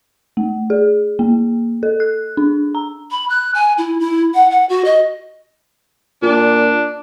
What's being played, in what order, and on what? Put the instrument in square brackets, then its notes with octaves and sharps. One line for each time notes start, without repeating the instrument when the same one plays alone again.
[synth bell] A3
G#4
A#3
A4
F#6
D4
A#5
[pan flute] B5
F#6
G#5
E4
E4
F#5
F#5
F#4
D#5
[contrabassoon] A#2 [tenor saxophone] D4